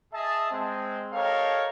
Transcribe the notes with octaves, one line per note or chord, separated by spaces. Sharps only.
G#4 D#5 E5 A5
G#3 C4
G4 A4 A#4 C#5 D#5 F5